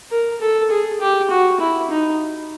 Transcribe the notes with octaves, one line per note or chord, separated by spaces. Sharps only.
A#4
A4
G#4
G4
F#4
E4
D#4